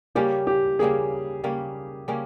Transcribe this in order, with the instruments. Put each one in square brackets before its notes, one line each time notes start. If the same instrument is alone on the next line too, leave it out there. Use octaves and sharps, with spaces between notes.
[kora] C#3 G3 A#3 C#4 [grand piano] G4
[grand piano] G4
[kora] C#3 G3 A#3 C#4 [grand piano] G#4
[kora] C#3 G3 A#3 C#4
C#3 G3 A#3 C#4